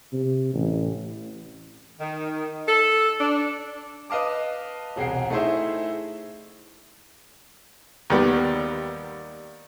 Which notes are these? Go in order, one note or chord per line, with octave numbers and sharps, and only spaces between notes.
C3
A1
D#3
A4
D4
B4 D#5 F5 A5 D6
E1 C2 G#4 F#5 G5 C7
A3 D#4 E4 G#4 C5 E5
D#2 D#3 G3 B3